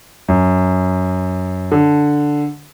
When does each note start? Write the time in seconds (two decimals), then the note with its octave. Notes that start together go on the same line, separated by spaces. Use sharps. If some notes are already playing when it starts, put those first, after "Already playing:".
0.28 F#2
1.72 D3